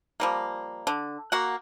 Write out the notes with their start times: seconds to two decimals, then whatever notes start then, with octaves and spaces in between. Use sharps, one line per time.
0.20 F3 G3 A#3
0.87 D3
1.32 A#3 F#4 F#5